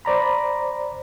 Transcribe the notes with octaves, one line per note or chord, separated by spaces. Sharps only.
C5 D5 A#5 B5